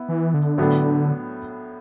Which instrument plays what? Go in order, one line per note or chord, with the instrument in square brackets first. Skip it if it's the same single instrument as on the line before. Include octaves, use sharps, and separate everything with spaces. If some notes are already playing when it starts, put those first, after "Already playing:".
Already playing: [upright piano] B3 E4
[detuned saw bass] E3
D3
[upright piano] A2 F#3 B3 D4 A4